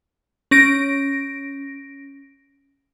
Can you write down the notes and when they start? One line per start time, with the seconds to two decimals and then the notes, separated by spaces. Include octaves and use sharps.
0.51 C#4 A#6 D7